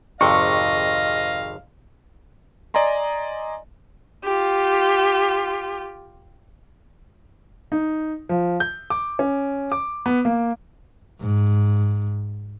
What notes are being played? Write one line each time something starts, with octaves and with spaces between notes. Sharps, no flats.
G#1 F2 C3 D#5 F5 C#6
D5 D#5 G#5 A#5 C6
F4 G4
D#4
F3
G6
D6
C#4
D6
B3
A#3
G#2